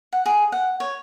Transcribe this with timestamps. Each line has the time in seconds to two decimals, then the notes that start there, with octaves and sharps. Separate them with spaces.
0.13 F#5
0.26 G#4
0.52 F#5
0.80 C#5